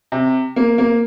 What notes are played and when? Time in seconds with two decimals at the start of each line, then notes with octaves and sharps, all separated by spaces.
0.12 C3
0.56 A#3
0.78 A#3